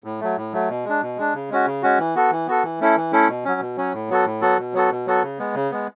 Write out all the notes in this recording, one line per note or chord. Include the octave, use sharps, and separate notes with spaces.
A2
F#3 A3
A2
F#3 A3
B2
G#3 D4
B2
G#3 D4
C#3
G#3 C#4 F#4
C#3
G#3 C#4 F#4
E3
B3 F#4 A4
E3
B3 F#4 A4
E3
A3 C#4 E4 A4
E3
A3 C#4 E4 A4
B2
F#3 C#4
B2
F#3 C#4
A2
F#3 B3 F#4 A4
A2
F#3 B3 F#4 A4
B2
F#3 B3 F#4 A4
B2
F#3 B3 F#4 A4
C#3
G#3 B3
C#3
G#3 B3